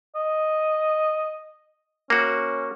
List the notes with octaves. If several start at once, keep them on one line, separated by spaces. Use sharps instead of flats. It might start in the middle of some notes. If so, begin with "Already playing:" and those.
D#5
A#3 C#4 F#4